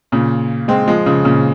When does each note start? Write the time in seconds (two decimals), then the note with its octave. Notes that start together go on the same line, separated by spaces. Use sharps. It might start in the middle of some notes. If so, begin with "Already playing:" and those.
0.12 A#2 C#3
0.68 G#3 C4
0.88 F3 G#3
1.06 C#3 F3
1.25 A#2 C#3